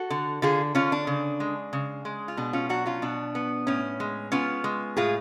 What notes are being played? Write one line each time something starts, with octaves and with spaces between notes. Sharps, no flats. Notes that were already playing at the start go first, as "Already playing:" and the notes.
Already playing: F#4 A4
D3
D3 F4 G#4
D3 C#4 F4
D4
C#3
G#3
C#3
G#3
F4
B2 D4
C#4 F4
F#3 D4 F#4
C#4 F4
B2 D4
B3
A2 C#4
G#3
B3 C#4 F4
G#3
A2 F4 G#4